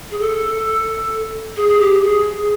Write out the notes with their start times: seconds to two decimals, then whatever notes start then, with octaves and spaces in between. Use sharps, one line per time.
0.11 G#4
0.19 A4
1.56 G#4
1.69 G#4
1.79 G4
2.02 G#4